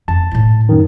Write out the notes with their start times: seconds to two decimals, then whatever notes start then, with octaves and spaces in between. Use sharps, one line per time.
0.08 F2 A5
0.31 A2 E4
0.69 F#2 D#3